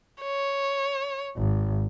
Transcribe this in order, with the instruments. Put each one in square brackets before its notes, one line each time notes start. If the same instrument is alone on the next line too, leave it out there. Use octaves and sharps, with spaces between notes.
[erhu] C#5
[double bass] G#1